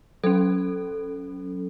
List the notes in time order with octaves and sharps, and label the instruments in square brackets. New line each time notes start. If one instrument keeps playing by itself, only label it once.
[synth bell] F#3 C#4 A4